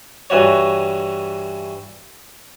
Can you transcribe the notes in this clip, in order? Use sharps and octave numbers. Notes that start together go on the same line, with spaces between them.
G2 E3 F#4 C#5